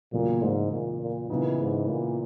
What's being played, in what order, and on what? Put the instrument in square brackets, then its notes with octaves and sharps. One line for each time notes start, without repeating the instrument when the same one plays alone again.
[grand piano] E2 C#3 F#3 A#3 [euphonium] A#2
[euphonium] G#2
A#2
A#2
[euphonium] A#2 [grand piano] C#3 E3 B3 D#4
[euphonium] G#2
A#2